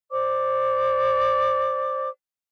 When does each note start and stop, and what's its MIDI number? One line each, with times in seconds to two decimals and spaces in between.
0.10 2.09 72
0.10 2.09 74
0.10 2.09 86